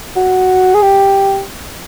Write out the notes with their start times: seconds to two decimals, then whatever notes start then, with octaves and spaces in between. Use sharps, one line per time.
0.16 F#4
0.75 G#4
0.82 G4